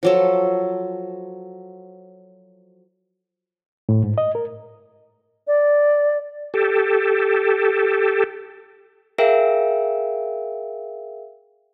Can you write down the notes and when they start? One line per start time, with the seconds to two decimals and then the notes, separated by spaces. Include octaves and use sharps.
0.03 F3 F#3 A4
3.89 A2
4.04 G#2
4.18 D#5
4.35 A#4
5.47 D5
6.54 G4 A4
9.18 G#4 A#4 E5 F5 G5 D7